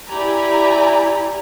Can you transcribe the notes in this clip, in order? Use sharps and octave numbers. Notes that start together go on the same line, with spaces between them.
E4 G4 D5 G#5 A#5 B5